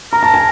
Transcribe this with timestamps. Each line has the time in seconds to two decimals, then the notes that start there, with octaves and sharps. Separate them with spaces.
0.12 A#4 A#5
0.23 A5
0.34 G#5